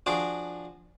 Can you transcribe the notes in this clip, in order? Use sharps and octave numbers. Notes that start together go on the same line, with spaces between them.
F3 D4 F4 F#4 G#4 D6